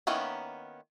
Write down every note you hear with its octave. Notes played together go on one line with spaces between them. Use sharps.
D#3 A#3 B3 C#4 E4